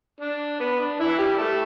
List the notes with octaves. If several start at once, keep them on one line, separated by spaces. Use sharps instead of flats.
D4
B3
D4
E3 E4
G3 G4
A3 A4